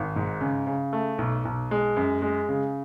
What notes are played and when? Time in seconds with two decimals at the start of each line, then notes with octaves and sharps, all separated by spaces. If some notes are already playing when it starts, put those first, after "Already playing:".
Already playing: G#1
0.16 G#2
0.41 C#3
0.67 C#3
0.93 A3
1.18 B1
1.45 B1
1.71 G#3
1.97 F#2
2.22 G#3
2.49 C#3